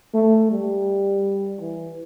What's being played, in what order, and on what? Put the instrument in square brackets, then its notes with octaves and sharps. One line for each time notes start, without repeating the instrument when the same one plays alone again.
[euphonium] A3
G3
E3